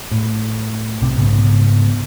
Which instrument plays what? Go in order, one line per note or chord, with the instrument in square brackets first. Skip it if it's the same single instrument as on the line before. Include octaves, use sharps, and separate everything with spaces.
[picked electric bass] A2
B1 C3
G#2 C#3 B3